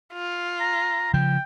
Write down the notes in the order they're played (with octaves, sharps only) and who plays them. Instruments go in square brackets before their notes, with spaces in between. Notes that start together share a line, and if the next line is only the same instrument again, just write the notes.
[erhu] F4
[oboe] A#5
[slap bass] C#3 F3 [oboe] G5